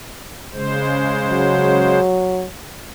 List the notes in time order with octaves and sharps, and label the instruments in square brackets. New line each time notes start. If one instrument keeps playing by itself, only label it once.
[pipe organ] C#3 G#3 C5
[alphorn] F#3